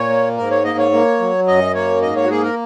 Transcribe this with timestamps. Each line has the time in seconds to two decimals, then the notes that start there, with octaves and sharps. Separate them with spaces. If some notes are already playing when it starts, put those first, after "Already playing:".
Already playing: A#2 C#5
0.09 A#3
0.37 G#2 A#4
0.51 C#5
0.64 A#3 D#5
0.78 C#5
0.92 A#3
1.20 F#3
1.47 F#2 D#5
1.74 A#3 C#5
2.02 G#2 D#5
2.16 C#5
2.25 F#4
2.29 A#3 G#4
2.43 A#4